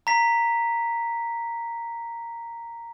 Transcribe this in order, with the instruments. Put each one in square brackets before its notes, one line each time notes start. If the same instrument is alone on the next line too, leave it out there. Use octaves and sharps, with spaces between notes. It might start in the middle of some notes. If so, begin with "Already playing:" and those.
[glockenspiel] A#5 B6